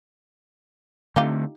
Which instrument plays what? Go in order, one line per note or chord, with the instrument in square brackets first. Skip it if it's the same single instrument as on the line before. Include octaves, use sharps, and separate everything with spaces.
[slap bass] D3 A3 C4 [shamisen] D#4 F4 G4